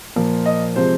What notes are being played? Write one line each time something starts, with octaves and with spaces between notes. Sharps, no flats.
A#2 F3 A#3
D#5
C3 F3 G#3 C5